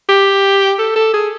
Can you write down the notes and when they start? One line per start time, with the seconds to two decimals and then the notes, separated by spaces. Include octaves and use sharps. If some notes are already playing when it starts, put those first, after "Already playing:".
0.09 G4
0.79 A4
0.96 A4
1.13 G#4